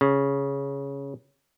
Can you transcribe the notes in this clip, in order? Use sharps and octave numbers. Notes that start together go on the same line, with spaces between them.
C#3